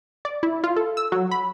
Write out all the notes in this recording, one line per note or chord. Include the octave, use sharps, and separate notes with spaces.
D5
E4
F4
A4
E6
F#3
B5